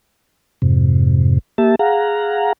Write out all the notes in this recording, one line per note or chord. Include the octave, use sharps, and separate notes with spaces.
F2 G#2 C3
A#3 G4 E5 A5
G#4 F5 F#5 A#5